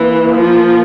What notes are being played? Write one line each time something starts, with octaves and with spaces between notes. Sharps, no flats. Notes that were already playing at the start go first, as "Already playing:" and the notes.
Already playing: E3 A#3
F3